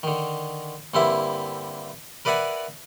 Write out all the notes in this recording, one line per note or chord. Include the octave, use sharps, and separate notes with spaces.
D3 D#3
G2 D3 A#3 C4 E4 E5
A#4 B4 D5 E5 F#5 G#5